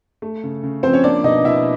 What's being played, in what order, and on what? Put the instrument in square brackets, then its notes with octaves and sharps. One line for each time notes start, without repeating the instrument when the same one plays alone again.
[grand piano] A3
C#3
C#3
F3 C4 C5
C#4 C#5
A#3 D4 D5
B2 D#4 D#5
B2 E4 E5